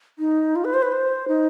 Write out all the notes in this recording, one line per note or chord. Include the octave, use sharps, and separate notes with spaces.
D#4
F4
B4
C5
B4
C5
D#4